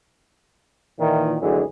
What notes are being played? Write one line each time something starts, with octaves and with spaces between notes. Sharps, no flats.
A#2 D#3 E3
G#1 D2 D3 E3 F#3 G#4